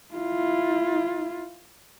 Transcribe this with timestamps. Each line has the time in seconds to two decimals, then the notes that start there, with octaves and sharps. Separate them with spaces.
0.15 E4 F4